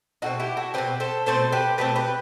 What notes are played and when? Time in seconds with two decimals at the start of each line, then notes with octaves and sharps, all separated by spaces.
0.22 B2 A3 C4 D#4 F#4
0.40 E4 G4
0.57 F#4 A4
0.74 B2 A3 C4 G4 B4
1.00 A4 C5
1.26 B2 A3 C4 A4 C5
1.52 G4 B4
1.78 B2 A3 C4 G4 B4
1.95 G4 B4